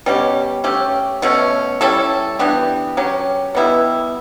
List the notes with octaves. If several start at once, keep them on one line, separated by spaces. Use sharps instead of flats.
B2 G3 C#4 G4
A3 C#4 G4
B2 A3 C#4
G3 C#4 E4 A4
E3 B3 D4 G4
F#3 C#4 G4
B2 G3 B3 E4